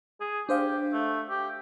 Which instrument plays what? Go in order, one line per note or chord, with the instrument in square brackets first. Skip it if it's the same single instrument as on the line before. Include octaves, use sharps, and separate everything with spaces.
[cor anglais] G#4
[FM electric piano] D4 C5 F5 [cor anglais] G4
[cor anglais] A3
G4